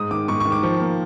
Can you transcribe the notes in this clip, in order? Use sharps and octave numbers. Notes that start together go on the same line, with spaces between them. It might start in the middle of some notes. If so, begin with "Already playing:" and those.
Already playing: G#2 D#6
D#3 D6
G#2 C#6
C#6
D#3
D6
F3 C#6
A#3